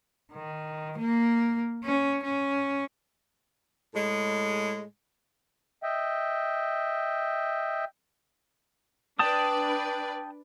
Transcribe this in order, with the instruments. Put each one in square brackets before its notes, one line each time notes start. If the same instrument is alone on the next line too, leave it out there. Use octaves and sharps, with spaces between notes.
[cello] D#3
A#3
C#4
C#4
[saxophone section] A2 G#3
[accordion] D#5 E5 G5
[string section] D4 B4 D5 [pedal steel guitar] G5 A5 D#6